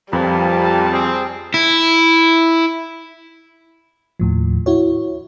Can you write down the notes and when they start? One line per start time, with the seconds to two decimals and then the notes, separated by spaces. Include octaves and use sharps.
0.13 F2 A#2 F3 G3 B4 A5
0.92 C4 G#4
1.54 E4
4.19 D#2 A2 F3
4.66 E4 F#4 C#5